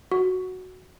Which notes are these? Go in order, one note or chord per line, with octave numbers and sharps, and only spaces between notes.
F#4